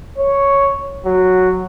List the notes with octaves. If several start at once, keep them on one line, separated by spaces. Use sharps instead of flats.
C#5
F#3